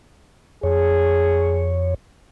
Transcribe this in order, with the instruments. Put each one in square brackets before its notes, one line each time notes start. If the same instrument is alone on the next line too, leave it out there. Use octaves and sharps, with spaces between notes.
[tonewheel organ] F2 C#5 [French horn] G#4